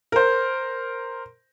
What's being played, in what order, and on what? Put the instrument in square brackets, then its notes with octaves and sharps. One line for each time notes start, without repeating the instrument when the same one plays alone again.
[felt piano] A#4 C5